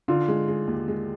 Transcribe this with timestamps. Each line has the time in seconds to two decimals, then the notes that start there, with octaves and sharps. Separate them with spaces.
0.08 D3 F4
0.28 G#3
0.48 G#3
0.68 D#2
0.88 G#3